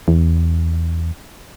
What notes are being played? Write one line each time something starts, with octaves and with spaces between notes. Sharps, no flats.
E2